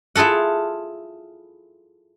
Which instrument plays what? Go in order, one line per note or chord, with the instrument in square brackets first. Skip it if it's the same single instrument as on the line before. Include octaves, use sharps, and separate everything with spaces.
[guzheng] E4 F4 G#4 A4 F#5